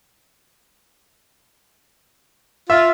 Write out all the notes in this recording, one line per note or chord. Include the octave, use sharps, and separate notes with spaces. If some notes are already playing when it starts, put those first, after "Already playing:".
F4 E5